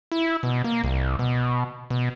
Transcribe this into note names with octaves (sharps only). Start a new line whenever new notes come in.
E4
B2
A#3
C2
B2
B2